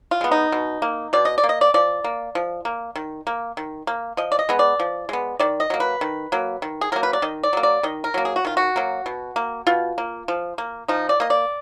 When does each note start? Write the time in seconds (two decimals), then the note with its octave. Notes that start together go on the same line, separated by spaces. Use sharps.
0.11 F4
0.21 G#3 B3
0.31 D#4
0.52 B2
0.82 A#3
1.13 B2 D5
1.25 D#5
1.38 D5
1.44 A#3
1.49 D#5
1.61 D5
1.74 F3 D5
2.04 A#3
2.35 F3
2.65 A#3
2.96 D#3
3.27 A#3
3.57 D#3
3.87 A#3
4.17 F3 D#5
4.32 D5
4.39 D#5
4.49 G#3 B3
4.59 D5
4.80 F3
5.09 G#3 B3
5.40 D#3 D5
5.60 D#5
5.70 F#3 A#3
5.80 B4
6.01 D#3
6.32 F#3 A#3
6.62 D#3
6.81 G#4
6.92 F#3 A#3 A#4
7.03 B4
7.13 D5
7.22 D#3 D#5
7.43 D5
7.53 F#3 A#3
7.63 D5
7.83 D#3 D#5
8.04 A#4
8.14 F#3 A#3
8.25 G#4
8.36 F#4
8.45 D#3 F4
8.57 F#4
8.76 F#3 A#3
9.06 B2
9.36 A#3
9.67 B2 F4
9.98 A#3
10.28 F3
10.58 A#3
10.88 F3 D#4
11.09 D5
11.20 A#3 D#5
11.30 D5